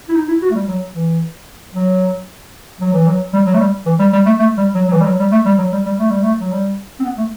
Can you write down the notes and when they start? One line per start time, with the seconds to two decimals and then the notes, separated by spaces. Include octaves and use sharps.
0.09 E4
0.16 D#4
0.28 E4
0.42 F#4
0.50 A3
0.55 G3
0.68 F#3
0.95 E3
1.74 F#3
2.81 F#3
2.94 E3
3.07 F#3
3.33 G3
3.46 F#3
3.54 A3
3.59 G3
3.86 E3
3.99 G3
4.13 G3
4.26 A3
4.39 A3
4.58 G3
4.75 F#3
4.88 F#3
4.93 E3
5.00 G3
5.05 F#3
5.20 G3
5.32 A3
5.46 G3
5.58 F#3
5.72 G3
5.86 G3
5.98 A3
6.10 G3
6.22 A3
6.40 F#3
6.52 G3
6.99 C4
7.04 B3
7.17 A3